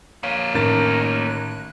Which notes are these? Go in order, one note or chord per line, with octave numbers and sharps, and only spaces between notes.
A#3 C#5 F5
A1 D#3 A#4 A6
F#6